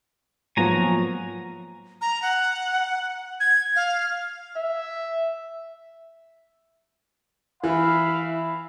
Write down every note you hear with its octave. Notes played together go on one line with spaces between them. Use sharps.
G#2 F3 F#3 A#3 B3 F4 G#5 A#5
A#5
F#5
G#6
F5
E5
E3 E5 F5 B5